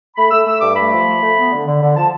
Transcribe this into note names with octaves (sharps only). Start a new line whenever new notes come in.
A3 B5
A3 E6
A3 E6
G2 D6
A3 B5
F3
A3
A3
B3
D3
D3
D3
F3 A5